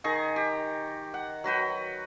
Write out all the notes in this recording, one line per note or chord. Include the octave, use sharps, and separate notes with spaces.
D#3 G#4 A#5 C#6
G4
F#5
F#3 F#4 B4 G5